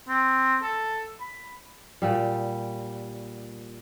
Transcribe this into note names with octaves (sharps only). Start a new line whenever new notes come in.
C4
A4
B5
A#2 G3